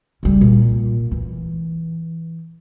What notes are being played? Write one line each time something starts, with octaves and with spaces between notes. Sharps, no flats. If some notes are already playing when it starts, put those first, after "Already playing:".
C#3 G3
A#2
E3